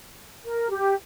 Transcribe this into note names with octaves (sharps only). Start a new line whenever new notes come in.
A#4
G4